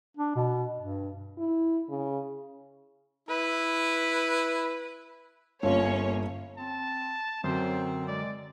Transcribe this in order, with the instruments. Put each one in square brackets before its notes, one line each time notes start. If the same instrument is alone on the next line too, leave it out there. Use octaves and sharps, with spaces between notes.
[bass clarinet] D4
B2
G2
[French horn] E4
C#3
[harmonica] E4 [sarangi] B4
[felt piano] G1 F4 [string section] A#3 C#4 C#5
[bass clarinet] C4 [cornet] A5
[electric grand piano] F#2 F#3 [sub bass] D3 [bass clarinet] C4 [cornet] C5
[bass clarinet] G#3 [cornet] D5